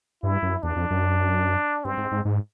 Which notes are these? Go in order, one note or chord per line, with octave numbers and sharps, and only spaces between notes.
G2 E4
F#2
E2 D4
F2
F#2
G2 C4
G#2
G#2
G#2